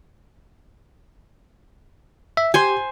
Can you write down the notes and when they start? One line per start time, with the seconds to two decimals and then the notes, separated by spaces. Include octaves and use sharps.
2.37 E5
2.54 G4 C5 G#5 C6